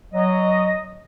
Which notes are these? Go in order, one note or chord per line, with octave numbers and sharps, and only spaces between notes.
F#3 D#5